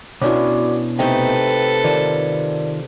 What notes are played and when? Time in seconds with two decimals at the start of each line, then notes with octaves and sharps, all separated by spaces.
0.22 B2 B3 C#4 D4 E4 F#4 D5 D6
0.99 C3 A3 D#4 A4 B4 G5
1.84 D#3 F4 A#4 D5 A5